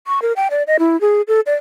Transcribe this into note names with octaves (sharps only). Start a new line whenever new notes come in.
C#6
A#4
G5
D5
D#5
E4
G#4
A4
D5